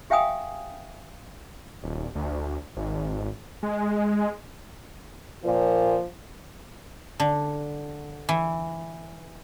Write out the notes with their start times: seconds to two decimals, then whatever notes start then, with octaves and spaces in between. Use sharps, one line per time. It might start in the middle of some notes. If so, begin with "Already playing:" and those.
0.10 G4 E5 F5 G5 G#5 D#6
1.83 D#1
2.15 D2
2.77 G#1
3.63 G#3
5.44 A#2 F3
7.20 D3
8.29 E3